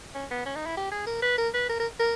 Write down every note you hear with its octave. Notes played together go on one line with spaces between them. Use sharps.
C#4
B3
C#4
D#4
E4
G4
G#4
A#4
B4
A#4
B4
A#4
A#4
A#4